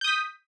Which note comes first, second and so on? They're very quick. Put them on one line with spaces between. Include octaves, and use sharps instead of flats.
G6 D#6 B6